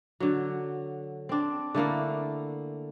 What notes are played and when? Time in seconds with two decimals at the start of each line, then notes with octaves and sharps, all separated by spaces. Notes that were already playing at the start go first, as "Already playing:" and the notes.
0.20 D3 F#3
1.29 C4 D4
1.75 D3 A3 A#3 E4